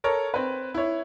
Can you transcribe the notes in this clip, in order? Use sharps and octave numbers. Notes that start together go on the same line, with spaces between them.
A4 A#4 C#5
C4 B4
E4 C#5